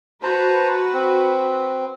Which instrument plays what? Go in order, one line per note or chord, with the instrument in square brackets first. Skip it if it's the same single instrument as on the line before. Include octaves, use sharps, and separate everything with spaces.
[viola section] F#4 B4 [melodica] C5 A5 A#5
[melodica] C4